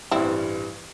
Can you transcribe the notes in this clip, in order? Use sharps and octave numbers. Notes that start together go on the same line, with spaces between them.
A1 G2 E3 G3 C4 E4